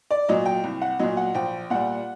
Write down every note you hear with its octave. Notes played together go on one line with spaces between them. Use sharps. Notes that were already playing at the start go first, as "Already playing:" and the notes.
D5
A#2 F#3 D#5
G5
C2
F#5
A#2 F#3 D#5
F#5
A#1 G5
A#2 G3 F#5